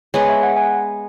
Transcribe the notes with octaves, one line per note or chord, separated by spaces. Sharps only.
G#3 B3 G#4 B4 C#5
E5
F#5
G#5